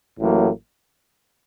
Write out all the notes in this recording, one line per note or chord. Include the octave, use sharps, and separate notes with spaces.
A1 A2 F#3 A#3